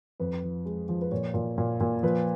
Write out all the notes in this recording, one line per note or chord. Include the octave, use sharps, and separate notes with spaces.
F2 B4
F3
G#3
F3
B4
A#2 C#5
A#2
A#2
A#2
F3 B4